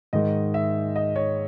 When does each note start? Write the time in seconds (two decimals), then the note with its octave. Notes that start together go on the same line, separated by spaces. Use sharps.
0.13 G#2 D#3 G#3 D#5
0.54 E5
0.96 D#5
1.16 C#5